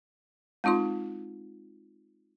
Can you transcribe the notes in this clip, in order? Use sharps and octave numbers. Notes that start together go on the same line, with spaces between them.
G#3 C4 D#4 F4 C6